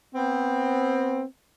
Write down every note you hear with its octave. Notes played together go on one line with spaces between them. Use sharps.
B3 C4